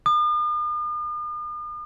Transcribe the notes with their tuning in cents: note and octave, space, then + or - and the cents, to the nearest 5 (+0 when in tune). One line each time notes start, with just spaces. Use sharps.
D#6 -45